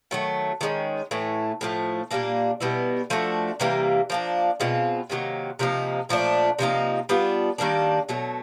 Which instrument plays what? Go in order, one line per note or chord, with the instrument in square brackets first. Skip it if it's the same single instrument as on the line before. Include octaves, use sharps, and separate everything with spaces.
[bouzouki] D#3 F#3 A3
D#3 G#3 C#4
A2 E3 A3
A2 F3 A3
A#2 G3 A#3 D4
B2 G3 B3 E4
F3 A3 D4 F#4
C3 E3 G3 A#3
F3 A#3 D4
B2 G#3 C4 F4
C3 D#3 F#3 A#3
C3 F3 A#3 D#4
A#2 F3 A3 D4
C3 F3 A#3 D#4
G3 B3 D4 F4
D#3 G3 A#3 D4
B2 F#3 A3